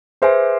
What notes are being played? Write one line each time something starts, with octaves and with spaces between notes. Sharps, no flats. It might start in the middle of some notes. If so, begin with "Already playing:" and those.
G#4 B4 C5 E5 G#5